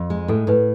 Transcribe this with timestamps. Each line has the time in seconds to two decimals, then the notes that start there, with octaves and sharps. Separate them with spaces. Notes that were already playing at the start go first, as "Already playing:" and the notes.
Already playing: F2
0.10 G#3
0.28 A2 A4
0.47 A2 B4